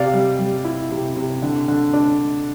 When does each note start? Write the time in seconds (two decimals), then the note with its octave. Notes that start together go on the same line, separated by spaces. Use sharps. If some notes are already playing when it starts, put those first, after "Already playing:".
Already playing: C3 D5 F5
0.13 G3
0.39 G3
0.64 E4
0.91 C3
1.16 C3
1.42 D3
1.68 D3
1.93 D4